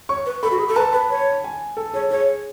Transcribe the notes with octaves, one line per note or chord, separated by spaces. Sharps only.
C#5 C#6
B4
A4 B5
F#4
G#4
A4
B4 A5
B4 B5
C#5
G#5
A4
G#4 C#5
G#4 C#5